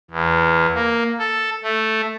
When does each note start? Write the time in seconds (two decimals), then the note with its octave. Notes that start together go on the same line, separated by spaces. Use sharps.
0.10 E2
0.74 A#3
1.19 A4
1.63 A3